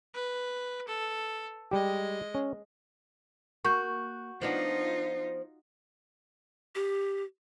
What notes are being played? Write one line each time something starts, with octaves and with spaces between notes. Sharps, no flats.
B4
A4
G3 G#3 G4 D#5
C#4
A#3 F#4 C#6 G6
F3 B3 D4 D#4 F4
G4